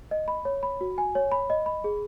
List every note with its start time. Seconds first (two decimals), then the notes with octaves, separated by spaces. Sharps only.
0.11 D#5
0.28 B5
0.45 C#5
0.63 B5
0.81 F#4
0.98 G#5
1.15 C#5
1.32 B5
1.50 D#5
1.66 B5
1.84 G#4